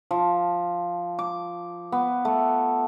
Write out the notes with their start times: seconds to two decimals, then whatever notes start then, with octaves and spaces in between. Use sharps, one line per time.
0.11 F3
1.19 D6
1.92 B3
2.25 A3